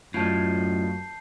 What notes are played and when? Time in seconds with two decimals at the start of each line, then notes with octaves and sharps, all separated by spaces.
0.14 F#2 A2 F4 D5 D#5 A5 G6 C7